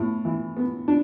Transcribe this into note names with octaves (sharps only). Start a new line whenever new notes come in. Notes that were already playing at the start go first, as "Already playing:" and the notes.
Already playing: A2 B3
E3
B3
D4